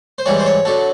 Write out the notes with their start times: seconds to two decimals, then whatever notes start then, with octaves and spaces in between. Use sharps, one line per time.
0.18 C5
0.26 G#2 E3 G3 C#5
0.39 C5
0.46 C#5
0.65 D3 F#3 A4